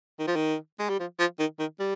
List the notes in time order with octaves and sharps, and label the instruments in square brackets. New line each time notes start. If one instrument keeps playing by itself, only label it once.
[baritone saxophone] D#3
F3
D#3
G#3
G3
F3
F3
D#3
D#3
G3